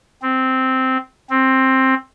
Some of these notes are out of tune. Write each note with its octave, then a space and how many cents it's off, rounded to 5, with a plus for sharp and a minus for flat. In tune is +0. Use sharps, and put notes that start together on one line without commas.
C4 -5
C4 +15